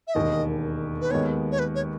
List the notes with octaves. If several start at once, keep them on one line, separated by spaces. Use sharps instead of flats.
E5
E1 D#2 D#3 D#5
B4
D#2 D#3 G#3 B3 C#5
C#5
B4
C#5